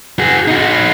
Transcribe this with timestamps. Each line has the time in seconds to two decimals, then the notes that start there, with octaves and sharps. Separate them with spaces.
0.19 F#4 G#4
0.48 D#4 F#4